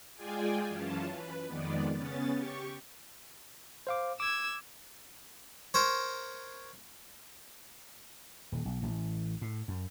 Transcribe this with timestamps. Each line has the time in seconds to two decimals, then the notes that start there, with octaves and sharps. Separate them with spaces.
0.15 G#3 F4 G#4 D5 G5 G#5
0.67 F#2 E3 C#4 F4 A5
1.10 B4
1.47 F2 D#3 G#3 B3 D5
1.95 C#3 B3 C#4 A6
2.32 G4 C#6
3.87 C5 F5 D6
4.20 D6 E6 G#6
5.74 A#4 C5 C#5
8.52 D#1
8.65 B1
8.83 A1
9.41 A2
9.68 F#2